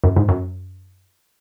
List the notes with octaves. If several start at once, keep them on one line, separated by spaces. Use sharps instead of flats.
F#2
G#2
F#2